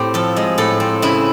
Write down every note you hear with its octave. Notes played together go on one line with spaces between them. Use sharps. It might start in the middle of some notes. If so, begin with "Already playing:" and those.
Already playing: A2 C4 G4
F3 A4
G#3
A2 A4
C4
C#3 E4